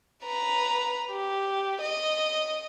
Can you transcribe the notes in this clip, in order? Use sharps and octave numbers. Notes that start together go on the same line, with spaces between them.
B4 A#5
G4
D#5